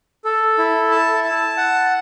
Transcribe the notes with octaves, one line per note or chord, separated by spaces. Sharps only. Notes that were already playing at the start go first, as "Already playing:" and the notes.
A4
E4
A5
A5
F#5